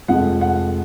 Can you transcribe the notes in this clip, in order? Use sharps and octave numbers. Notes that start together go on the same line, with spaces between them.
F1 F2 F3 G#3 F#5
F#5